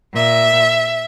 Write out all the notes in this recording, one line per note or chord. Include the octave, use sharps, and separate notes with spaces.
A#2 E5